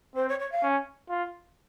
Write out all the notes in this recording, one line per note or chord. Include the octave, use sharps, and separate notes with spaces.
C4 C5
C#5
C#5
F5
C#4
F4